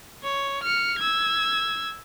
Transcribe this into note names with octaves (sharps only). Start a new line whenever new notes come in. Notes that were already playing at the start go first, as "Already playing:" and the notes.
C#5
F6 C#7
E6 G#6